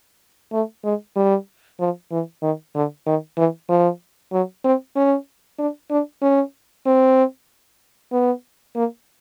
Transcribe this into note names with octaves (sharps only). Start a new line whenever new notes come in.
A3
G#3
G3
F3
E3
D#3
D3
D#3
E3
F3
F#3
C4
C#4
D4
D4
C#4
C4
B3
A#3